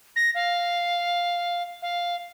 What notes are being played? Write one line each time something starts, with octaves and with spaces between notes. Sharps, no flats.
A#6
F5
F5